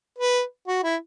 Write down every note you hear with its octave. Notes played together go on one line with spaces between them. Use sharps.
B4
F#4
E4